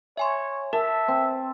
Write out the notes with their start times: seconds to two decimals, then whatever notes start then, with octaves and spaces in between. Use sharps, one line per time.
0.17 C#5 E5 G#5 C6
0.73 A#4 E5 A5
1.08 C4